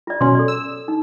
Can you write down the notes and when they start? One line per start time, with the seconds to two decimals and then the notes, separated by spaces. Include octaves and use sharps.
0.07 F4 D5
0.21 B2 F#3 C#4 C6
0.35 A4 D5
0.48 E6
0.88 D#4